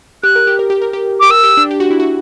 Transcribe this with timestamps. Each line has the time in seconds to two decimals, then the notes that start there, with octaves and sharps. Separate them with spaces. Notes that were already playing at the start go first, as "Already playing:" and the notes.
0.23 G4 F#6
0.35 A#4
0.47 G4
0.59 A#4
0.70 G4
0.82 A#4
0.93 G4
1.20 G4 D6
1.30 A#4 E6
1.43 G4
1.57 D4
1.71 G4
1.80 F#4
1.91 E4
2.00 F#4